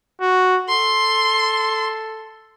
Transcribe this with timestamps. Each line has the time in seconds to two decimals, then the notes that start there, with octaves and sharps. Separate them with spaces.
0.21 F#4
0.69 A4 C6